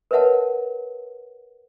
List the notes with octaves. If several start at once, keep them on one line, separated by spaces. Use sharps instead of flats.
A#4 B4 C#5 E5 F#5 A5